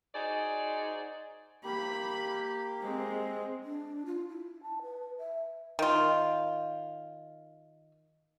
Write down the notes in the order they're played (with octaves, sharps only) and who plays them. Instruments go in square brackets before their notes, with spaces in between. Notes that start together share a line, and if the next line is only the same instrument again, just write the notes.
[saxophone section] D#4 F#4 G#4 C5 D5 D#5
[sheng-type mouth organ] A#3 G4 [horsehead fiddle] B5
[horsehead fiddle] G#3 C4
[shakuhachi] D4
F4
E4
A5
B4
E5
[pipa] D#3 F4